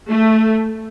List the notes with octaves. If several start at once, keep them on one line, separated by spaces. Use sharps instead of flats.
A3